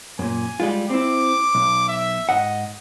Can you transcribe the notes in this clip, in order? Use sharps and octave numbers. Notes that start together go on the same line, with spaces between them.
F#2 A#2 G#5
G3 G#3 F4
C4 E4 D6
B1
E5
G#2 D#5 F#5